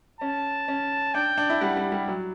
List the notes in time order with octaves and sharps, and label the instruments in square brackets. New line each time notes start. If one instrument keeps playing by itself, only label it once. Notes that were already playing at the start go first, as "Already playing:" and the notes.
[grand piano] C#4 [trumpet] A5
[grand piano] C#4
[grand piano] D4 [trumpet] G5
[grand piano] D4
E4
[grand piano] G3 [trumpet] F#5
[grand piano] G3
G3
F#3